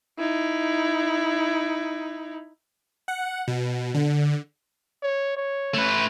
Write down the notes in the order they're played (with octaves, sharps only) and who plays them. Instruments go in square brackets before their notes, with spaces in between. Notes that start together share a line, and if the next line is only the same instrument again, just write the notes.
[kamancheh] D#4 E4
[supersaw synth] F#5
B2
D3
[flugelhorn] C#5
C#5
[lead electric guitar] A3 B4